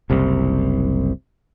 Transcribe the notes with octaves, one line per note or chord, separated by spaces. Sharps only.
F#1 C2 C3